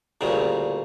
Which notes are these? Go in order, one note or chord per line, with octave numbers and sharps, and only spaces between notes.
D2 A#2 C#3 G3